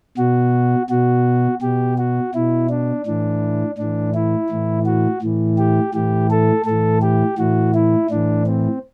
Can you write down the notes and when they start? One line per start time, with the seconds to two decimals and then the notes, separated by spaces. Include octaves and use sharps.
0.17 B2 F#4
0.90 B2 F#4
1.62 B2 G4
1.98 F#4
2.34 B2 E4
2.70 D4
3.06 A2 E3 D4
3.78 A2 E3 D4
4.14 E4
4.50 A2 E3
4.86 F#4
5.22 A2 E3
5.58 G4
5.94 A2 E3 G4
6.31 A4
6.66 A2 E3 A4
7.02 G4
7.38 A2 E3 F#4
7.74 E4
8.10 A2 E3 D4
8.46 C4